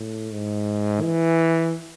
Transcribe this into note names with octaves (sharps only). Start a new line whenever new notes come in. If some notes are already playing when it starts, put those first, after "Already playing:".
Already playing: A2
G#2
E3